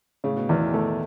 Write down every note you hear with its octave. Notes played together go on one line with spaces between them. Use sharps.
A2 C#3
B2
E2 D#3
E3
D#3 A3